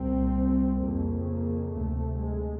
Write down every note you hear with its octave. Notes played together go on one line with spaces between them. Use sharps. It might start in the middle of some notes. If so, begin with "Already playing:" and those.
Already playing: C2 A#2 C4
F2 C#3 A#3
A#3
D2 C3 A3
G#3